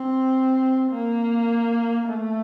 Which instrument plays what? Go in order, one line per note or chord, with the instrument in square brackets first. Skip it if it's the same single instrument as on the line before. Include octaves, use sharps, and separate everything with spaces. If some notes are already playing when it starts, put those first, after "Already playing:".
Already playing: [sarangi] C4
A#3
A3